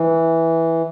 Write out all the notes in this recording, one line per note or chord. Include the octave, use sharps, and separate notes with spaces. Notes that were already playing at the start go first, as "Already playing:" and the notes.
Already playing: E3